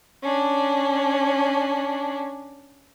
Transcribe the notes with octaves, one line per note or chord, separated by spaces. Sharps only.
C#4 D4